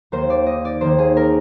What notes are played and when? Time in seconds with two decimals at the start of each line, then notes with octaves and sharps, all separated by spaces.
0.12 D#2 D#3 A#3 C5
0.30 D5
0.46 D#5
0.65 D5
0.81 D#2 D#3 A#3 C5
0.99 G#4
1.17 A#4